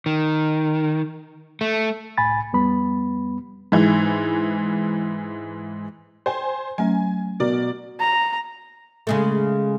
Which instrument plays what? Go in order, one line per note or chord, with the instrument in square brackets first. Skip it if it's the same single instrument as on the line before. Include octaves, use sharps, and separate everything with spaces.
[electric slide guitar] D#3
A3
[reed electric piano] C2 A2 G#5 B5 A6
F2 G3 B3 B5
[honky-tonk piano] G#2 E3
[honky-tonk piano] C5 G#5 [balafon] G5
[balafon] F#3 A3 C#4 [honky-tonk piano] G#5
[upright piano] B2 [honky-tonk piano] A#4 D5
[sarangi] A#5
[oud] C#3 G#3 A3